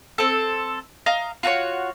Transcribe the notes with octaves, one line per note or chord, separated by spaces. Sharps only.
C4 A4
D#5 F5 A#5
F4 F#4 A4 C#5